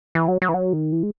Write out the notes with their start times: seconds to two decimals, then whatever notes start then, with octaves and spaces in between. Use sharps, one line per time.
0.15 E3
0.28 F#3
0.42 F#3
0.49 E3
0.54 F#3
0.73 D#3
0.92 E3
1.03 G#3